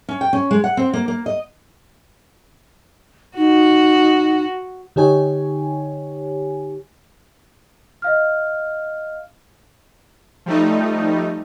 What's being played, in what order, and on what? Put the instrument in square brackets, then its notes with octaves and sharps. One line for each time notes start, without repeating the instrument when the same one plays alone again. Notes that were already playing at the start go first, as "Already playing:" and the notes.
[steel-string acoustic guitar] C#4
G5
C#4
G#3
F#5
C4
A#3
A#3
D#5
[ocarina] D#4 [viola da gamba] F#4
[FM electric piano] D3 D#4 G4 C#5 G#5
[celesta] D#5 F5 F6
[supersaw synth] F3 G3 A3 D#4